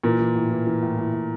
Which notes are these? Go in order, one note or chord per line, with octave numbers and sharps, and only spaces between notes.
A#2 E3 A#3
E3
A2
E3
E3
A2
A2
A2